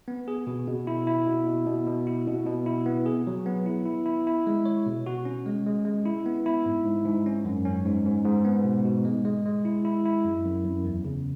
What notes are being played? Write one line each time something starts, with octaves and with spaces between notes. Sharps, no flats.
B3
G#4
B2
B2
E4
E4
B2
B2
B2
B2
E4
B2
B2
E4
B3
G#4
F#3
B3
E4
E4
E4
E4
G#3
C#5
B2
F#4
C#4
G#3
G#3
G#3
E4
B3
E4
G#2
G#2
G#2
C#4
F#2
C#4
G#2
G#2
G#2
B3
B2
B2
G#3
G#3
G#3
E4
E4
E4
F#2
F#2
F#2
E2
C#3